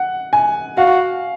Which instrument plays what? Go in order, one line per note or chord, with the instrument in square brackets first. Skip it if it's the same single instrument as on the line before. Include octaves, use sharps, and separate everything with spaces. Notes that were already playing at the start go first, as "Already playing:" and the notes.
Already playing: [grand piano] F#5
G#5
[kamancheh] F#4 [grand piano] F5